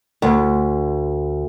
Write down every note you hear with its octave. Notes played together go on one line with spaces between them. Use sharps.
D2